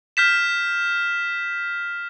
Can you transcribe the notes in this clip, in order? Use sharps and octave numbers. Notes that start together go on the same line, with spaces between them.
F6 G6 B6 E7